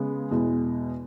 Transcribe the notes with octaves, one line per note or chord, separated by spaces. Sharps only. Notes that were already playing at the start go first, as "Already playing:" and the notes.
Already playing: C#3 G#3 B3
E2 B2 G#3